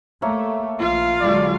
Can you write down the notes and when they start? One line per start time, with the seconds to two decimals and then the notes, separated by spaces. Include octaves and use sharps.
0.22 A3 A#3 C#5 E5
0.79 A#1 F4 F5
1.21 D3 F#3 G#3 D5